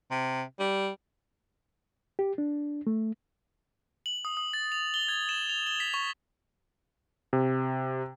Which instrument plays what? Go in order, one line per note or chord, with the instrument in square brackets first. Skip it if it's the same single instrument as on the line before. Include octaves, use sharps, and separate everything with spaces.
[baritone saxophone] C3
G3
[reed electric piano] G4
D4
A3
[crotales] F#7
D#6
D#6
A6
F7
G7
G#6
E7
F7
G7
B6
C#6
[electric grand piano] C3